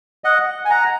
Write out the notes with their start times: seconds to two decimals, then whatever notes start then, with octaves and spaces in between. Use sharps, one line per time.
0.24 D#5 F#5
0.65 G#5
0.70 F#5 A#5